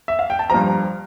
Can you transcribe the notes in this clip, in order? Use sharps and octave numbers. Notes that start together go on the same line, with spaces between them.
E5
F5
G5
A5
G2 F3 A#5